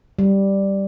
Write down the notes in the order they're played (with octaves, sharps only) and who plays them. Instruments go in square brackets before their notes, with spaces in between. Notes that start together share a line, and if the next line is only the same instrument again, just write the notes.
[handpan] G3